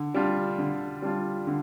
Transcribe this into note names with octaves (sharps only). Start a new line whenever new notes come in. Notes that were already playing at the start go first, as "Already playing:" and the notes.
Already playing: D3
G3 D4 F4
D3
G3 D4 F4
D3